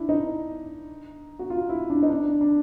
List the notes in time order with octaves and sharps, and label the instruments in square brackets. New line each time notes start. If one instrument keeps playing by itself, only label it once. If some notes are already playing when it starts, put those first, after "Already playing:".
Already playing: [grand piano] D4 E4
D#4
F#4
F4
E4
D4
D#4
D4
D4
D4